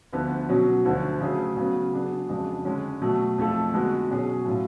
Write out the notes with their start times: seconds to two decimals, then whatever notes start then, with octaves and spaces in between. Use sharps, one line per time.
0.13 D2 D3 F3 B3
0.49 B2 F#3 C#4
0.85 D2 D3 F3
1.20 C#3 F#3 A3 C#4 G#4
1.57 C#3 F#3 B3
1.93 F#3 B3 D4 G#4
2.29 F2 C#3 G#3 D4 F#4
2.65 D3 G#3 C#4
3.02 B2 F#3 A3
3.38 F2 F3 A3 F4 A4
3.74 D3 G#3 B3 F#4
4.10 B2 F#3 C#4 G#4 C#5
4.46 A2 F#3 C#4 F4